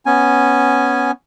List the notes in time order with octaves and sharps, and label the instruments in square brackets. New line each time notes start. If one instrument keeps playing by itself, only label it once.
[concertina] B3 C#4 G#5